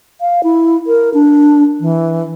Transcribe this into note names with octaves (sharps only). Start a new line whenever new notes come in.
F5
E4
A#4
D4
E3